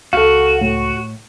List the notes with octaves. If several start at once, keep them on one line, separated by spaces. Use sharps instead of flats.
C#2 F#4 A4 F5
A2